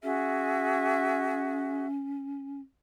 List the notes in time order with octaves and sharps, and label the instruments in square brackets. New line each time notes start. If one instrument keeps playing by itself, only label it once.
[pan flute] C#4 [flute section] F#4 G#4 E5